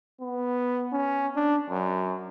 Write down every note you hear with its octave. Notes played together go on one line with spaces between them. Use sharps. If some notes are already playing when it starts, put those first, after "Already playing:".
B3
C#4
D4
F#2